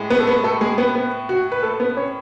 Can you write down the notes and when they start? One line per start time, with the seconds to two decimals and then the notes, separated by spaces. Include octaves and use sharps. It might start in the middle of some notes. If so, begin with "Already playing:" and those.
Already playing: A2 G#3
0.10 B3 B4
0.20 A4
0.27 B3 B4
0.44 A3 A4
0.61 G#3 G#4
0.78 B3 B4
0.95 B3 B4
1.29 F#4
1.52 B4
1.63 A3 A4
1.80 B3 B4
1.97 C#4 C#5